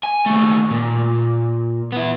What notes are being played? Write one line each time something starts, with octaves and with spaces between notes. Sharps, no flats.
G#5
D#2 A3
A#2
B3 E4